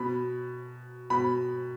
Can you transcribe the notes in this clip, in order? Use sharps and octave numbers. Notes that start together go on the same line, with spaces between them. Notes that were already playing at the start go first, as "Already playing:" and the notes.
Already playing: B2 B5
B2 B5